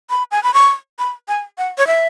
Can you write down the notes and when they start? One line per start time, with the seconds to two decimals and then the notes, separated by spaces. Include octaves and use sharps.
0.10 B5
0.31 G#5
0.43 B5
0.54 C#6
0.99 B5
1.28 G#5
1.58 F#5
1.78 C#5
1.87 E5